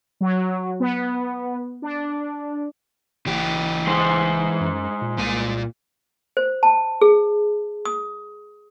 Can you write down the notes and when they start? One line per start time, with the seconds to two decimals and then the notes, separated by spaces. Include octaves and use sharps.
0.20 F#3
0.80 B3
1.82 D4
3.27 F#1 E3 G4
3.87 G#3 C5
4.60 F#2
5.01 A#2
5.18 C2 A#2 G#5
6.37 C5
6.63 A5
7.02 G#4
7.85 D#6